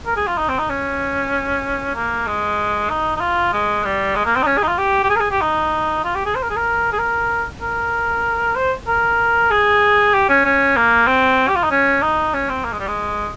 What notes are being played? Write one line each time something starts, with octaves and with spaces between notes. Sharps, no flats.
A#4
G#4
F4
D#4
C4
D#4
C#4
A#3
G#3
D#4
D#4
F4
G#3
G3
G#3
A#3
C4
D#4
C#4
G#4
D#4
F4
G4
G4
G#4
A#4
G#4
G4
D#4
F4
G4
G#4
C5
A#4
G#4
A#4
G#4
A#4
A#4
C5
A#4
G#4
G4
C#4
C#4
A#3
C4
G4
F4
D#4
C#4
D#4
C#4
C4
A#3
G#3
G3
G#3